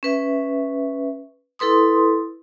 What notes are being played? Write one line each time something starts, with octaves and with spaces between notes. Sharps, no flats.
C#4 B4 E5
E4 A4 B4 C6 D#6